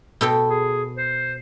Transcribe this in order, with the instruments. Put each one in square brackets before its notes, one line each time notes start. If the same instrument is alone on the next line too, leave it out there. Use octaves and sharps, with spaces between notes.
[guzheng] B2 A4 G5
[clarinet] G#4
C5